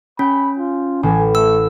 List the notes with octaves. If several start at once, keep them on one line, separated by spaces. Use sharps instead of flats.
C#4 G5 B5
F4
A1 G#5
A3 E6